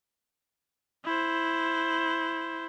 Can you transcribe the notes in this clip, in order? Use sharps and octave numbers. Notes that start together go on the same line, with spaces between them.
E4 C5